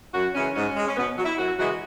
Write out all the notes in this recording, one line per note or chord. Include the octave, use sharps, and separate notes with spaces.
F#2 F#4
C#3 E3 G#3 C#4
G#2 C#4
G#3
C#4
B2 B3
F#3
E4
F#2 F#4
C#3 E3 G#3 F#4